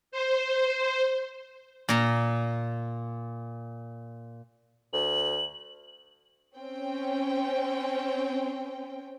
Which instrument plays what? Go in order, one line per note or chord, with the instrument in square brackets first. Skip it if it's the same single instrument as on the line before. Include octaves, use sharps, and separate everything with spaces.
[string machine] C5
[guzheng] A#2 A#5
[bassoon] D2 [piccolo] F#7
[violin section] C4 C#4 G5